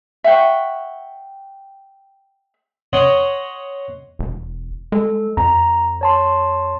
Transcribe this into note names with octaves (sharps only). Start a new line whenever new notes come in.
E5 F#5 G5 C#6
C#5 D#5 F#5 C6 C#6
E1
G#3 A4
F2 A#5
C#5 A5 C6